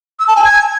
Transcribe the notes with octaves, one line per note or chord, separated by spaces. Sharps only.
E6
A5
G#5
G#6